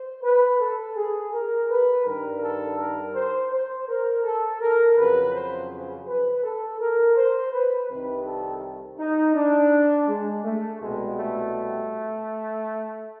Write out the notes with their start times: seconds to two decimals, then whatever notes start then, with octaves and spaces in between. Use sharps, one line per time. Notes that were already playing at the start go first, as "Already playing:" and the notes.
Already playing: C5
0.23 B4
0.60 A4
0.96 G#4
1.32 A#4
1.69 B4
2.05 G2 D#3 G3 A#4
2.42 A4
2.78 A#4
3.15 C5
3.52 C5
3.88 A#4
4.24 A4
4.61 A#4
4.97 F2 C#3 F#3 B4
5.34 C5
5.70 C5
6.07 B4
6.44 A4
6.79 A#4
7.16 C5
7.52 B4
7.89 C2 C3 D#3 G3 B4
8.25 A4
8.99 D#4
9.35 D4
10.08 G#3
10.44 A3
10.80 C2 B2 G3 G#3
11.18 A3